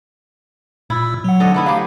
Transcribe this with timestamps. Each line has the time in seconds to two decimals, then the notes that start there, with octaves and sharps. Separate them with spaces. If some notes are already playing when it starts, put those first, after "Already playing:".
0.90 A#2 E4 E6
1.24 F#3 F#5
1.40 D3 A4 D#5
1.54 A3 B3 E4
1.66 F#3 G4 F5